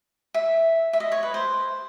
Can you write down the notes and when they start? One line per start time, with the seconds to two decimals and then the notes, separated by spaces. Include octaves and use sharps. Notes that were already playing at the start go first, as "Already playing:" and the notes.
0.34 E5
0.93 E5
1.00 D#5
1.12 C#5
1.23 B4
1.34 C5